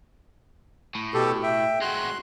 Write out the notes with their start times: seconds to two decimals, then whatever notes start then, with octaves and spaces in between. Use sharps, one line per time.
0.95 A2
1.14 B2 G4 A4
1.43 E5 G5
1.82 G#3 F#4 C6 F#6